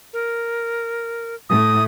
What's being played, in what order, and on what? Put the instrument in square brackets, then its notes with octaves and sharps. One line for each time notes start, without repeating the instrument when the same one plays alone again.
[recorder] A#4
[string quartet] A2 A3 [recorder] D#6